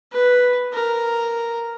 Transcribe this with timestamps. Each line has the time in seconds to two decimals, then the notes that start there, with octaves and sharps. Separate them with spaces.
0.12 B4
0.73 A#4